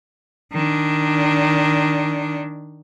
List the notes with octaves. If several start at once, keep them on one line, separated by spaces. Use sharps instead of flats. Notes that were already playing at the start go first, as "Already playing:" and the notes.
D#3 D4